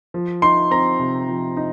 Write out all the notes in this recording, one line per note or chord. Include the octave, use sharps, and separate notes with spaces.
F3
D#4 C6
C4 A#5
C3
F3
D#4